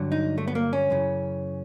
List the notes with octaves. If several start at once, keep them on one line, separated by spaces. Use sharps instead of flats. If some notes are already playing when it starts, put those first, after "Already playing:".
Already playing: G2 D3 F#3
D#4
A3
B3
A#3
C#4
F#2 C#3 E3